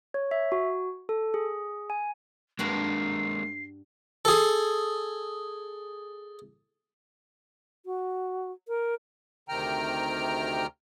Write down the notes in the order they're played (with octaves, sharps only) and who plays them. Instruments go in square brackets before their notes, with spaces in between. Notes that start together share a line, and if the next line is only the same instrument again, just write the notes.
[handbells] C#5
E5
F#4
A4
G#4
G#5
[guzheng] G2 D4 F#4 [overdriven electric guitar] G#3 A#3 [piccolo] C7
[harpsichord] G#4 A4
[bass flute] F#4
A#4
[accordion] D2 C3 D#3 G5 A#5 F6